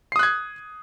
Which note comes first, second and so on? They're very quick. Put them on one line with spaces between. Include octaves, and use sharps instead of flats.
C7 D#6 F#6 G#6